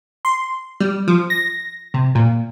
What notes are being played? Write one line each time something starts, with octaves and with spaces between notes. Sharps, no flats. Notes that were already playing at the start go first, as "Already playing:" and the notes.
C6
G3
F3
A#6
C3
A#2